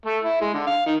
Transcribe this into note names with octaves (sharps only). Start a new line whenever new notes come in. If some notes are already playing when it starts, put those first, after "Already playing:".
A3
E4
G#3
D3
F5
D#3